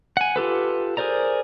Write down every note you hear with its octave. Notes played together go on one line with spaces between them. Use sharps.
F#5 G#5
F4 G4 A4 B4
G#4 A#4 C5 D5 A#5